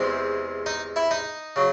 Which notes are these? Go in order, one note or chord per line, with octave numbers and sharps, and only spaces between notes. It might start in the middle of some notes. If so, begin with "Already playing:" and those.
Already playing: E2 C3 E3 G#3 C4 C5
D#4 D#5
E4 E5
D#4 D#5
C#3 F#3